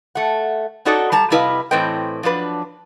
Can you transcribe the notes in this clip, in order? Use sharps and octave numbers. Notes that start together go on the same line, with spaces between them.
A3 F#5
C#4 D#4 F#4 A4 D5 D#5
G3 A5 A#5
C3 G3 E4 B4 D#5 F5
A2 E3 C4 B4 D#5 G5
F3 F#3 D4 B4